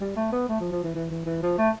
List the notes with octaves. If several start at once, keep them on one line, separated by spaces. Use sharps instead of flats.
G3
A3
B3
A3
F3
F3
E3
E3
E3
E3
F3
A3